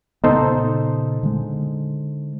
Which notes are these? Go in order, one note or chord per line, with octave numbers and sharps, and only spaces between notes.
A#2 C#3 B3 D#4 A4 C5
D3 G#3